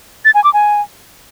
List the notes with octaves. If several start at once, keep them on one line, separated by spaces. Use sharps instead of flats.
A6
G#5
D6
G#5